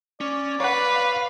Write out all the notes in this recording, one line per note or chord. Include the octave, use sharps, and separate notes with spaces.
C#4 D5
B4 C#5 F5 F#5